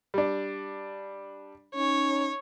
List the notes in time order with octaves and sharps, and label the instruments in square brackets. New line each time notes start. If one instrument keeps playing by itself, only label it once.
[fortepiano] G3 D4
[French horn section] C#4 D#4 [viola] C#5